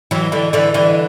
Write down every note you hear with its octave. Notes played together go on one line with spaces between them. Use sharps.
E3 F#3
D3 E3
D3 E3
D3 E3